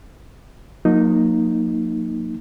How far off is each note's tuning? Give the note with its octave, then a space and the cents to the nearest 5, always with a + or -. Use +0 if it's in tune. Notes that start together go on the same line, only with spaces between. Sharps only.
F#3 -45 A#3 +0 D#4 +0